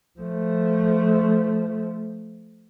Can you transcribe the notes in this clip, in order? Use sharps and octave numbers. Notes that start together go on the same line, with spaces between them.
F3 A3